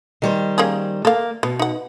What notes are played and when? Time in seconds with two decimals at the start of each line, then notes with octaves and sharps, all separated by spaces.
0.22 D#3 G3 C5
0.58 A#3 C#4 G#4
1.05 A#3 A4 F5
1.43 B2 B3
1.59 D#4 F#5